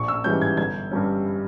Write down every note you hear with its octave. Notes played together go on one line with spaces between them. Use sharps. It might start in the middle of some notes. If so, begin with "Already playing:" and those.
Already playing: A#1 C#6
E6
G#2 E3 G3 C#4 G6
G#6
G1 G#6
G2 G3 C#4